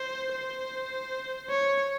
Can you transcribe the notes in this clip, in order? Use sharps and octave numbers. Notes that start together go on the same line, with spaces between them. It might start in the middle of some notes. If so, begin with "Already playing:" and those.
Already playing: C5
C5
C#5